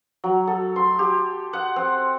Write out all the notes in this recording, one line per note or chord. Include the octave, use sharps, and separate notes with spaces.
F#3
A4
C6
G4
F#5
C4